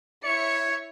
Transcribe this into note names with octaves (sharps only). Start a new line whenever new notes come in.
E4 C#5 E5 C#7